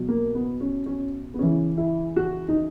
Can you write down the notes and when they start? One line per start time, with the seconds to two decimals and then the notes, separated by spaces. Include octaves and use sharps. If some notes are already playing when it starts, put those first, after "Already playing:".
Already playing: B2 F#3
0.08 A#3
0.35 B3
0.61 C#4
0.86 C#4
1.34 B3
1.38 C#3 E3 C#4
1.78 E4
2.16 F#4
2.48 D#4